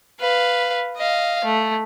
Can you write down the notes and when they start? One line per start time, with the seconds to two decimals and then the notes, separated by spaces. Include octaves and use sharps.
0.20 B4 F5
0.97 D#5 F5
1.44 A3